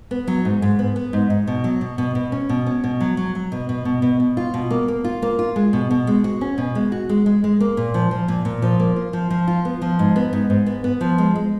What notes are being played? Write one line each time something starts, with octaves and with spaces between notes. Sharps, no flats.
B3
F#3
G#2
G#2
B3
B3
G#2
G#2
B2
F#3
B2
B2
B2
C#4
B2
C#4
B2
F#3
F#3
F#3
B2
B2
B2
B2
B2
F4
B2
A#3
A#3
F4
A#3
F4
G#3
B2
B2
G#3
F#4
C#4
B2
G#3
F#4
G#3
G#3
G#3
A#3
A#2
F3
F3
A#2
A#2
F3
A#3
F4
F3
F3
F4
B3
F3
G#2
B3
G#2
G#2
B3
B3
F3
G#3
G#3